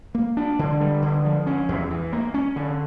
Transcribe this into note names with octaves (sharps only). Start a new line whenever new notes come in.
A#3
D4
D3
G3
D3
F3
C#4
E2
E3
A#3
C#4
D3